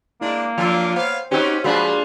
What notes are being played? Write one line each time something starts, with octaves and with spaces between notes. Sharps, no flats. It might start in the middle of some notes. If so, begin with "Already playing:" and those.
G#3 A#3 D4 E4
F3 D4 F4
B3 C5 C#5 F5
C4 C#4 D#4 F#4 G4 C5 C#5
F3 G#3 A#3 D4 F4 F#4 B5